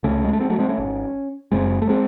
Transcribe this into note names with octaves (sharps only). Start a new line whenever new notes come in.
C#2 C#3 A3 C#4
G#3
A3
G#3 C4
F#3 A3
G#3 C4
A3 C#4
G#1 G#2
F#1 F#2 C#3 G#3 C4
A3
G#3 C4